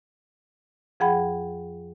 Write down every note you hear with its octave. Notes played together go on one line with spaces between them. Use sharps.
F2 F3 G#4 F#5 G5 B5